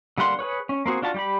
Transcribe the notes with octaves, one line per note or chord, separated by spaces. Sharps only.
D3 G3 A#3 F#5 C6
G#4 B4 C#5
C#4
A#3 C4 F#4 G#4
D4 F4 F#4 A5
G3 G4 B5